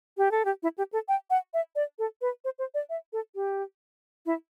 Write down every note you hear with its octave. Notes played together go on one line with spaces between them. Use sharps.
G4
A4
G4
E4
G4
A4
G5
F#5
E5
D5
A4
B4
C5
C5
D5
E5
A4
G4
E4